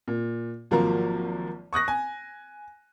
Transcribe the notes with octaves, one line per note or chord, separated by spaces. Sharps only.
A#2
G#1 F3 F#3 A#3 A#5
C#6 D#6 F#6 A#6
G#5